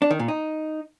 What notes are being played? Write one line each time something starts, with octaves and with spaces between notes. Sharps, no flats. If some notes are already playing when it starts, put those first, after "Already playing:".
D4
D#3
A#2
D#4